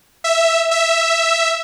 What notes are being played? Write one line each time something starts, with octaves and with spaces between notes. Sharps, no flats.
E5
E5